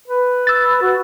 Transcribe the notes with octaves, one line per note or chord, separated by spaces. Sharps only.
B4
E6 A6
F#4